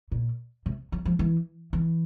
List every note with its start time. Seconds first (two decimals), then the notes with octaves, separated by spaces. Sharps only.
0.12 A#2
0.66 C3
0.92 F#3
1.05 F3
1.19 E3
1.73 E3